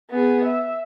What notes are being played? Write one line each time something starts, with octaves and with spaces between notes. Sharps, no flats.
B3 G#4
E5